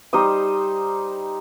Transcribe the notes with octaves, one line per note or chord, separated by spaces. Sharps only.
G3 D#4 C5 D#6